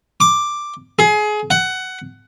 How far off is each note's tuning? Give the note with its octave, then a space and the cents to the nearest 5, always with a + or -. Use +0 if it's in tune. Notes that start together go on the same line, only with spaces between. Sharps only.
D6 +5
G#4 +25
F#5 +15